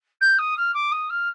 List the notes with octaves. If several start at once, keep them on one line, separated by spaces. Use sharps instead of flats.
G6
D#6
F6
D6
D#6
F6